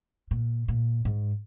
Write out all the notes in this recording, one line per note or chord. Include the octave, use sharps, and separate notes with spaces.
A#2
A#2
G#2